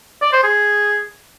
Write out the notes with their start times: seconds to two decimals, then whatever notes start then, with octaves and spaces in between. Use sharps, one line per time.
0.22 D5
0.32 C5
0.43 G#4